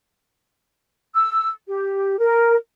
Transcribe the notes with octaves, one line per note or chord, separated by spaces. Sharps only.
E6
G4
A#4